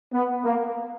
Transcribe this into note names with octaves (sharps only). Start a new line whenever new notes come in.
B3
A#3